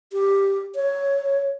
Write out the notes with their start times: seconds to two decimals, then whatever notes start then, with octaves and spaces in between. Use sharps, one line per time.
0.13 G4
0.75 C#5